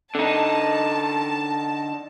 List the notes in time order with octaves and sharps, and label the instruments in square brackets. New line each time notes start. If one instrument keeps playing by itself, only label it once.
[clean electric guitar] D3 D#4 [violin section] A5